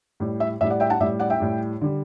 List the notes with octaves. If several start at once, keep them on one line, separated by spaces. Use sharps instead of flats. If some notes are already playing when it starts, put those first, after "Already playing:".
A2 G3
E5
A2 G3 E5
D5 F#5
E5 G5
F#5 A5
A2 G3 E5
D5 F#5
E5 G5
A2 G3
D3 G3